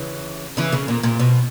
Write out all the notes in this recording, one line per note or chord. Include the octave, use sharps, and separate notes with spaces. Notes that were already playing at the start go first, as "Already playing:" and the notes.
Already playing: C#3 E3
C#3 E3
C#3
A#2
A#2
B2